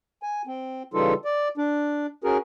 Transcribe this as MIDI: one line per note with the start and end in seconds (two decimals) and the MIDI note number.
0.23 0.42 80
0.47 0.83 60
0.94 1.14 49
0.94 1.14 52
0.94 1.14 55
0.94 1.14 63
0.94 1.14 65
0.94 1.14 69
1.25 1.48 74
1.58 2.06 62
2.24 2.37 61
2.24 2.37 66
2.24 2.37 68
2.24 2.37 70